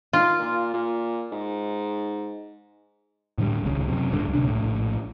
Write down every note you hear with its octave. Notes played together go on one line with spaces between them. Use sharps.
D#3 F4
A#2
A#2
G#2
A2 D3 D#3 G3
D#1 C#2 C#3
F#2 C3
D1 C#2 G2 D3
D1 D2 C3 D4
A#1 A2